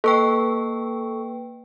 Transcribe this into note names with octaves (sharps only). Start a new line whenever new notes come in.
A#3 A4 B4 G5 C#6